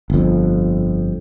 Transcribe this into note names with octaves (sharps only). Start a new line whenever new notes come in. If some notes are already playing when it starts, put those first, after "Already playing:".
G1 F2